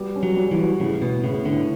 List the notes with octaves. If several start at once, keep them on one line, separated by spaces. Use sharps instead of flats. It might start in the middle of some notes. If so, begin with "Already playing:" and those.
Already playing: G3 B3
C#4
F#3
G3
E3
F#4
A2 C#3
B2 B3
A2 C#3
A2 D3